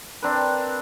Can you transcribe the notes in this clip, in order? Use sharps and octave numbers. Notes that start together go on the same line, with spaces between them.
C4 D4 A#4 B4